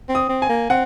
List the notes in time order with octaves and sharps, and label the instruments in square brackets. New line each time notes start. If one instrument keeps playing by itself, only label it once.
[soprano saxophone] C4
[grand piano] D#6
[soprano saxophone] C4
[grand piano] G#5
[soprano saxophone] A#3
[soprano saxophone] C4 [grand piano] F#5